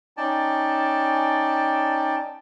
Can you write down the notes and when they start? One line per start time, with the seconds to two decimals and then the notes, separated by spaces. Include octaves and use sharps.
0.17 C#4 D#4 D5 G5 A5